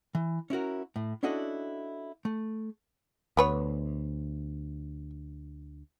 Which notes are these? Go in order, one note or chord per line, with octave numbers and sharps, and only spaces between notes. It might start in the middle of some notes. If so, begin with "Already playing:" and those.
E3
C#4 E4 F#4 A#4
A2
C#4 D4 E4 F#4 A4 D#5
A3
D2 B3 B4 C#5